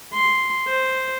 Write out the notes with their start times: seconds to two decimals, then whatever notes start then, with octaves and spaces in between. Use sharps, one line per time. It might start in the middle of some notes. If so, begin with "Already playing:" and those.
0.13 C6
0.68 C5